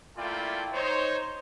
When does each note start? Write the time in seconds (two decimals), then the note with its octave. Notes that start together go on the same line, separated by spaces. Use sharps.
0.17 A3 A#3 E4 F4 D5 G5
0.73 D#4 C5 C#5